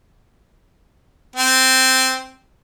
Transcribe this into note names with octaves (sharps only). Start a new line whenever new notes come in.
C4